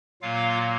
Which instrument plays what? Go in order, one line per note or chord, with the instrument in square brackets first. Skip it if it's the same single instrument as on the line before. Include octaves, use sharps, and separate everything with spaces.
[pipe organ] A#2 F#3 A#3 F4 F5